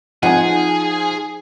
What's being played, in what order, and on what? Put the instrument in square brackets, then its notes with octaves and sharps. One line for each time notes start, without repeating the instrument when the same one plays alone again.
[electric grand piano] F3 F4 [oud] D#4 [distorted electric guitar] G#4 [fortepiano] F#5 G#5